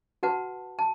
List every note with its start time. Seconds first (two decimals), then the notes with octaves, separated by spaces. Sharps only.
0.23 F#4 B4 F#5 A5
0.79 A5